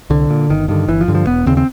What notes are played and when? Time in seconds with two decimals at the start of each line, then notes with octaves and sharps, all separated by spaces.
0.10 C2 D3
0.30 A#2
0.49 G1 D#3
0.68 G2 D3 D#3
0.88 G1 E3
1.01 F3
1.08 G2 D3
1.15 F3
1.27 E1 B3
1.46 D#2 C#3 C4
1.57 C4